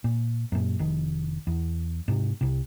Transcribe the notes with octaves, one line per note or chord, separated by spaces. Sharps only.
A#2
F#2 A#2
F1 D#3
E2
G#2 C3
C2 C3